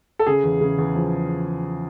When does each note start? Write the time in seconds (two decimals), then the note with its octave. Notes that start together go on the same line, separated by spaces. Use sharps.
0.19 A4
0.27 C#3 G#4
0.44 E2
0.61 C#3
0.78 E2
0.96 F3